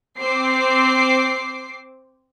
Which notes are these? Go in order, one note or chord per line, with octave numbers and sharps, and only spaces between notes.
C4 C5 D6 C7